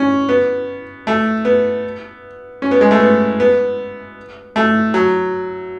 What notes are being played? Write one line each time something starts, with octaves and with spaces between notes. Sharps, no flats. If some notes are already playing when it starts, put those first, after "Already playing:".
Already playing: C#4
B3
A3
B3
C#4
B3
G#3
A3
B3
B3
A3
F#3